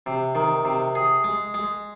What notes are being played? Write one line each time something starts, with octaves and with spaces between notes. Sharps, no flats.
C3
D#3
C3
G#4
G#3
G#3